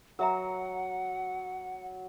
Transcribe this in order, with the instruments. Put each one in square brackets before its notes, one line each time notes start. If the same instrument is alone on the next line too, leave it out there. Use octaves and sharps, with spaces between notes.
[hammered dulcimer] F#3 [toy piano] A#4 E5 A#5 [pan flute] F#5